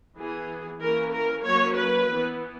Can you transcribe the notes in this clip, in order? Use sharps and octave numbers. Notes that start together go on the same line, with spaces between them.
E3 B3 G#4
E3 A#3 C#4 A#4
A#4
F#3 A#3 C#4 C#5
B4
E3 B3